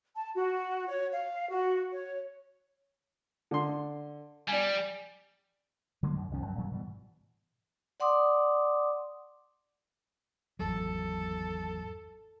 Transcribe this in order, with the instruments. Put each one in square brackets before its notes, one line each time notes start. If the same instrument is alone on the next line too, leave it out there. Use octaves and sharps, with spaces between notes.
[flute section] A5
F#4
C#5
F5
F#4
C#5
[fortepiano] D3 C6
[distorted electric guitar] G3 [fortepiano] D5 G#5
[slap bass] D3 F#3 G#3 A#3
F#2
C2 D#3 F3 C#4
F#2 F#3
A#2 D#3 F#3 G3
G#2 B2 E3 G3
[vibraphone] D5 F#5 C6 D6 D#6
[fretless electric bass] G#1 E2 F#3 [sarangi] A4